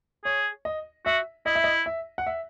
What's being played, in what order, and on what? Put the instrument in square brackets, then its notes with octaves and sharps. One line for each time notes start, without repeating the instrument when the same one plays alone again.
[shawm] G#4 [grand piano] C#5
[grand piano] D#5
[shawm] F#4 [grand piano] E5
[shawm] E4 [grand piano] D#5
[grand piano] E5
D#5
E5
F#5
E5